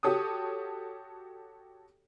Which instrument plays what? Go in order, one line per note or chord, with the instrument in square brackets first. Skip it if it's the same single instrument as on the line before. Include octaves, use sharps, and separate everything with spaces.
[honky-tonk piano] F#4 G4 A4 C#5 D#6